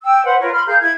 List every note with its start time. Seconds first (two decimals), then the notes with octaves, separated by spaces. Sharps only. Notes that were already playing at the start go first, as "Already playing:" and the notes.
0.04 G5 E6
0.24 B4 C5 F#5
0.40 F4 A#4 B4 C#5
0.53 B5 C6 F6
0.66 G#4 A#4 F5 G6
0.79 E4 G#6